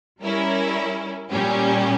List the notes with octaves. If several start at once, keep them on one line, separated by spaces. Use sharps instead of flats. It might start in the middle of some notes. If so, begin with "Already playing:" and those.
G3 C#4 E4 A#4
A#2 G3 C#4 G4